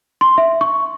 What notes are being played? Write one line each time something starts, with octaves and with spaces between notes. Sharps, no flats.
C6
E5
C#6